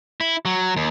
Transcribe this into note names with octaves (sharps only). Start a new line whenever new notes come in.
E4
F#3
D#2